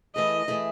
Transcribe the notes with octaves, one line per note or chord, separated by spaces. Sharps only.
E3 A3 E4 G#4 D#5
E3 A3 E4 G#4